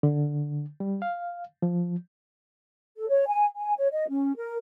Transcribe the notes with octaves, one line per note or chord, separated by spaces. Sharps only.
D3
G3
F5
F3
A4
C#5
G#5
G#5
C#5
D#5
C#4
A#4